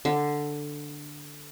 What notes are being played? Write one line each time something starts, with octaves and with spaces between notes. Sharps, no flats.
D3